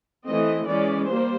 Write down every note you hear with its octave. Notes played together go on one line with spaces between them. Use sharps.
E3 A3 C4 D#5
E3 G#3 C#4 D5
G3 A#3 C5